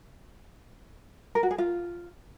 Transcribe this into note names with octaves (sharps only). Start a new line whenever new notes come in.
A#4
F#4
G#4
F4